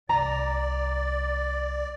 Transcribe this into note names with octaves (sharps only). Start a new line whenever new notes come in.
C2 D5 A#5